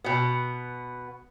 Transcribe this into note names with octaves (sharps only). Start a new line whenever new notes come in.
B2 B3